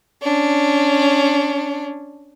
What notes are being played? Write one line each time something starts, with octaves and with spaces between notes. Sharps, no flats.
C#4 D4